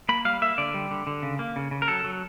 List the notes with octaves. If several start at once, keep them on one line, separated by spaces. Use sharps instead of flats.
A#3 B5
G3 F5
A#3 E5
D3 D5
G3
D3
D3
C#3
A#3
C#3
C#3
A#4
F#3 A4
F#3